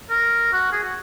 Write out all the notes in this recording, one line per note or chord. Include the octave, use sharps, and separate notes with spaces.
A#4
F#4
G#4
F#4